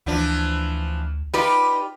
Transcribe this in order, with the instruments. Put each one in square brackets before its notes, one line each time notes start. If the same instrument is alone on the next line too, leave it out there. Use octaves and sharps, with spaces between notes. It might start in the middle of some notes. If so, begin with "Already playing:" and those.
[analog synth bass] D2 [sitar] E3 F3 D4
[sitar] D#4 F4 [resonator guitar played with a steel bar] G4 B4 D5